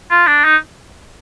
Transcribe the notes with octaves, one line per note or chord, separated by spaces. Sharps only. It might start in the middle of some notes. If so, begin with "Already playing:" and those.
F4
D4
D#4